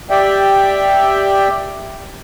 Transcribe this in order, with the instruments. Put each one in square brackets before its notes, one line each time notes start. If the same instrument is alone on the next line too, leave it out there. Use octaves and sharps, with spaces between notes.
[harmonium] G4 D5 E5 G5